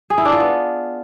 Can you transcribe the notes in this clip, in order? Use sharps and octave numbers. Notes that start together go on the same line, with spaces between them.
G#4
E4
D4
F4
B3